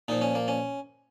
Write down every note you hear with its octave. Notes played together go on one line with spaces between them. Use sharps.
A#2 F3 D#4
C#4
A#3
C#4